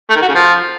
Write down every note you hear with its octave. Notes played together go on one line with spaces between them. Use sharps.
A3
D#3
F#4
C#3
F3